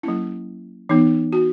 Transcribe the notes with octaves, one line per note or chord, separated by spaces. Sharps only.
F#3 A#3 C#4 E4
E3 B3 D#4
F#4